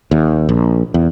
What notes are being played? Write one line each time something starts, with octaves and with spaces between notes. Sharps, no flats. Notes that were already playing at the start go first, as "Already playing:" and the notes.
D#2
A#1
E2